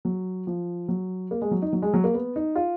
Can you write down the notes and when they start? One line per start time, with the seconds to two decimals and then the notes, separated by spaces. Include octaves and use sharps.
0.05 F#3
0.47 F3
0.88 F#3
1.31 A#3
1.42 G#3
1.51 F#3
1.62 D#4
1.73 F#3
1.82 G#3
1.94 F#3
2.04 A#3
2.14 B3
2.36 D#4
2.56 F4